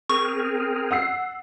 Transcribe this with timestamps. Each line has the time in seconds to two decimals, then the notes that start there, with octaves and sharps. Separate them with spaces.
0.10 C4 G#4 A#4 C#6
0.91 F#5 E6 C7